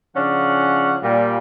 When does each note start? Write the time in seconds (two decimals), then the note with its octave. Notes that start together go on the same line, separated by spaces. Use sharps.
0.16 C#3 F3 C#4 D4 F#5
1.03 A#2 G3